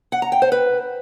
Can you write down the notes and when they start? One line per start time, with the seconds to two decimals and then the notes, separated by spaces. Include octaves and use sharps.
0.12 F#5
0.22 A#5
0.32 G5
0.42 C5
0.52 B4